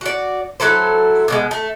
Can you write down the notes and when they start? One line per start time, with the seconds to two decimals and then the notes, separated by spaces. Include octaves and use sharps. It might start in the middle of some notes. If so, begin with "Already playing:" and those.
0.01 F#4 D5
0.60 F#3 E4 A4 C5
1.28 B2 G3 G#3
1.51 A3